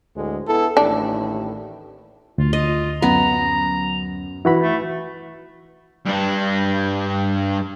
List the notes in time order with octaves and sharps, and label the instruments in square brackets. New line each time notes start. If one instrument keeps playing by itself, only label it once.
[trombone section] D2 A2 G#3
B3 E4 A4
[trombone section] A1 D#2 A2 [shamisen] D4
[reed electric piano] D2 [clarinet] F4
[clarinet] F4 [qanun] D#5
[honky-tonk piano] F#2 [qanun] B3 [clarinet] A#5
[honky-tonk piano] E3 [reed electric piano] E4 F#4 B5
[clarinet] A3
[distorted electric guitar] G2 D4